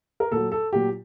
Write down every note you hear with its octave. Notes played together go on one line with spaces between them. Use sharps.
A#4
A#2 F#3 A4
A4
A#2 F#3 G4